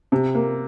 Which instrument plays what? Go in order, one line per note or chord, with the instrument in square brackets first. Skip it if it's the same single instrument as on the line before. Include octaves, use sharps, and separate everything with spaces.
[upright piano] C3
A#3